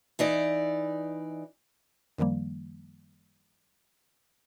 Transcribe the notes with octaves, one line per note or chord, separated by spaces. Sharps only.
E3 D#4 D5
F#2 D#3 F3 G3 A#3